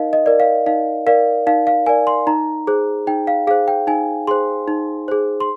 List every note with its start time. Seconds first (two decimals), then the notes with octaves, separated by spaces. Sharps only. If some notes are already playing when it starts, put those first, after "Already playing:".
Already playing: D#4 A#4 D#5 F5
0.13 D#5
0.26 A#4 D5
0.40 F5
0.66 D#4 F5
1.07 A#4 D5 F5
1.47 D#4 F5
1.67 F5
1.87 A#4 D5 G#5
2.07 C6
2.27 D#4 A#5
2.67 G#4 C5
3.07 D#4 G5
3.27 F5
3.47 G#4 C5 F5
3.68 G5
3.87 D#4 G#5
4.27 G#4 C5 C6
4.68 D#4
5.08 G#4 C5
5.40 C6